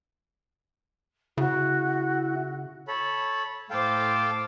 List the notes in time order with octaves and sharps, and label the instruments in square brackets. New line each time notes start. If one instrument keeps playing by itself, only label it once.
[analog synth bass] C#3 [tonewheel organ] E4 [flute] F#4
[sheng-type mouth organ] A4 C#5 B5
[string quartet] A2 C5 D6 [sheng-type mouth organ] A4 F5 G5